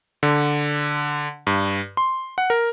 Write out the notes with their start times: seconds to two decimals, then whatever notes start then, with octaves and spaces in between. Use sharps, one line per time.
0.23 D3
1.47 G2
1.97 C6
2.38 F#5
2.50 A#4